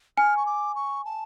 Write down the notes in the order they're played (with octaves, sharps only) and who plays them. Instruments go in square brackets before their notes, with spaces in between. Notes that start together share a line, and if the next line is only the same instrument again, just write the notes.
[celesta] G#5 [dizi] F6
[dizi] C#6
D6
C#6
A5